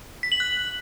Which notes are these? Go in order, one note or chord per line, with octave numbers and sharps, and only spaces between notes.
B6
F#7
F#6